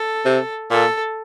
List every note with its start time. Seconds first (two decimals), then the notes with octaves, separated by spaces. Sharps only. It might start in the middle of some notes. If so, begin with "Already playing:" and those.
Already playing: A4
0.25 C3
0.71 A#2 A4